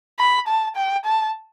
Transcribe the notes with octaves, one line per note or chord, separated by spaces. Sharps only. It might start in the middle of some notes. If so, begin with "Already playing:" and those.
B5
A5
G5
A5